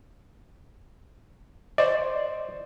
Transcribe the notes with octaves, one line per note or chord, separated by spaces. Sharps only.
C5 D5 D#5